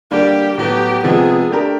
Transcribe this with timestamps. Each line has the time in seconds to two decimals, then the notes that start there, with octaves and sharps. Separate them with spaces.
0.11 D3 G3 A#3 D4 G4
0.57 A2 F#3 B3 G4
1.03 C3 F3 G#3 B3 G#4
1.51 A3 D4 G4 A#4